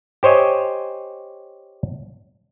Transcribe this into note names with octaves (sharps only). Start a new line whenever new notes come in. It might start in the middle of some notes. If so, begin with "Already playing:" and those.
G4 C5 C#5 D#5 G#5